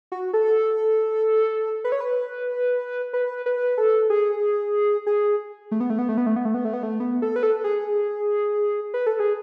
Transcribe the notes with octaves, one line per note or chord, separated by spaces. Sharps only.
F#4
A4
B4
C#5
B4
B4
B4
A4
G#4
G#4
A3
B3
A3
B3
A3
B3
A3
B3
A3
B3
A3
B3
A3
B3
A4
B4
A4
G#4
B4
A4
G#4